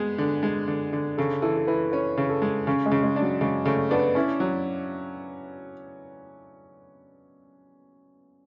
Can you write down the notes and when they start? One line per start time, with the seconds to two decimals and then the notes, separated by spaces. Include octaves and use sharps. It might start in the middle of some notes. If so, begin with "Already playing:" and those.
Already playing: G#3 B3 G#4
0.18 D3
0.43 G#3
0.68 D3
0.93 D3
1.18 C#3 A4
1.42 E3 A4
1.56 A4
1.67 E3 B4
1.92 C#4 B4
2.17 C#3
2.29 A4
2.42 G#3
2.67 C#3 C#4
2.86 G#3
2.91 C#3
3.03 G#3
3.16 D4
3.22 F#3
3.41 C#3 G#3
3.65 C#3 A3
3.91 B3 D4
4.15 C#4 E4
4.40 F#3